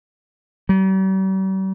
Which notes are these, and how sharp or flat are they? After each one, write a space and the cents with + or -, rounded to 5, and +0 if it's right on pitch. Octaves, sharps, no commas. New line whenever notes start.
G3 -45